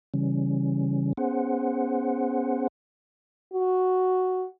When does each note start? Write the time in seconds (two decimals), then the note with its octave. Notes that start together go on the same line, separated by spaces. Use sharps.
0.14 C#3 E3 G3 C#4
1.17 B3 C#4 G#4 C5 F#5
3.54 F#4